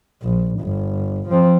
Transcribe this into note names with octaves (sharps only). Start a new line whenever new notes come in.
A#1
G1
F3 C4